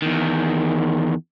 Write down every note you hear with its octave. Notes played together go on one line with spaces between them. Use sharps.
E2 D#3